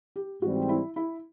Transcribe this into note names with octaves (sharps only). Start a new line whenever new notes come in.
G4
G#2 E3 G3 C4 F#4
E4
E4